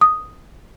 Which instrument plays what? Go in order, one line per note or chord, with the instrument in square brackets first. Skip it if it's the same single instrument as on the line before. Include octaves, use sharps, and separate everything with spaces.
[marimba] D#6